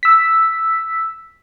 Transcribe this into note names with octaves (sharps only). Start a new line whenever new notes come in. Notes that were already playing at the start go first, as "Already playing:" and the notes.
E6 B6